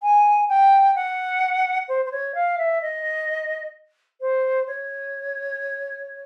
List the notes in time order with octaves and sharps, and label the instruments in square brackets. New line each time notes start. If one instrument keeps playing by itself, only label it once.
[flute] G#5
G5
F#5
C5
C5
C#5
F5
E5
D#5
C5
C#5